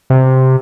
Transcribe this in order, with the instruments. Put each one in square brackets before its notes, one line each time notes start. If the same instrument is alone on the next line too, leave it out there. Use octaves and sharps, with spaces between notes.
[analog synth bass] C3